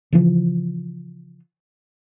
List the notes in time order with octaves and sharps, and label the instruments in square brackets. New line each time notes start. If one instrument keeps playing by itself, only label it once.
[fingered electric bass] C#3 E3 F3